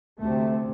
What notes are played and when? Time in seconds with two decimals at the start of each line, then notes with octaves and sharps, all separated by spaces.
0.19 D2 C3 A3